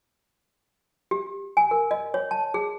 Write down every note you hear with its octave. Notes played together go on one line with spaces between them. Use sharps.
G4
G#5
A#4
D#5
C#5
A5
G#4